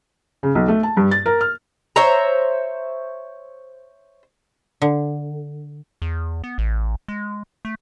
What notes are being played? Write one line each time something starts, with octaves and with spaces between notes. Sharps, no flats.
C#3
B1
A3
A5
G2
A6
A#4
F6
C5 C#5 E5 A#5
D3
E2
B3
A1
G#3
A3